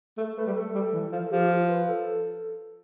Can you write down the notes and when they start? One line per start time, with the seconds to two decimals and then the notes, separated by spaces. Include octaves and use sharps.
0.18 A3
0.37 A3 B4
0.46 G3
0.56 A3 A4
0.75 G3
0.93 E3
1.12 F3
1.26 A4
1.32 F3 G4
1.43 G4
1.51 F4
1.69 B4
1.88 A4